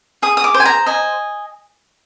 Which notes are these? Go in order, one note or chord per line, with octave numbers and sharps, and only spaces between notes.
G#4 D#6
D#6
D6
C5
G#5
A#5
D#5 G#5